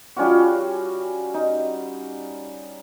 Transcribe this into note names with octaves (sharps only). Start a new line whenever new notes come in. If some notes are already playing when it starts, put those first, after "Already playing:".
G3 C#4 F4 F#4
D#4